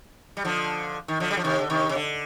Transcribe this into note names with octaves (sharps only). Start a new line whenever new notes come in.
G3
D3 F3
D#3
D3 F3
G3
F3
C3 D#3
D3
C3 D#3
C3
D3